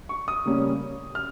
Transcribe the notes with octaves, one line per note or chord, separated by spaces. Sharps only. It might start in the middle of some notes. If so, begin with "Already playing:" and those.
C#6
D#6
C#3 G3 A#3 C#4
F6